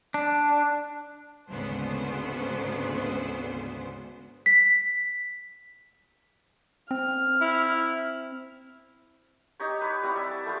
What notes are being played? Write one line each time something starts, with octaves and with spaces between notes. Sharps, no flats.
D4
G#1 D2 C#3 B3 C5
B6
C4 F6
E4
D#4 G4 C#5
B4 C#5
G3 C4 E4 F#5
D5 E5
A5
A3 B3 F4 G4